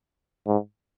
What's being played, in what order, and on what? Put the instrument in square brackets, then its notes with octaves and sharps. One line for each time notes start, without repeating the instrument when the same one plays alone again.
[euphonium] G#2